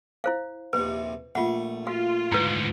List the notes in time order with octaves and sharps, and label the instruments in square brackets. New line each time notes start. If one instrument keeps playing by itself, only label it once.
[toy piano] E4 C5 F5
[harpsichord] A#1 D#2 C3 [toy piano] B4
[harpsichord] A#1 A3 [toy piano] F4 F#5
[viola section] F4 [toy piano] F#4 F5
[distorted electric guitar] D2 G#2 [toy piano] E4 B4